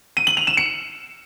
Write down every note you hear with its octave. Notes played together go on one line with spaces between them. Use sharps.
D#7
F#7
F7
E7
C#7